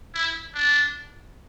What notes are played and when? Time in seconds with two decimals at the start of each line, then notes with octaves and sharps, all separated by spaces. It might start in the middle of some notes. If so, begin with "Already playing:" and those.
0.15 E4
0.54 D4